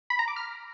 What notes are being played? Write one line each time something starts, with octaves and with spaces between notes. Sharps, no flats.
B5
A#5
D6
F6